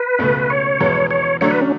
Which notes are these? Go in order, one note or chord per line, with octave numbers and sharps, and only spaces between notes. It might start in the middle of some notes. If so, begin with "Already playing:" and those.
Already playing: B4
C#2 B2 A3
C#5
E2 B2 G#3
C#5
D3 F#3 A3 D4 A4 C#5
B4
C#4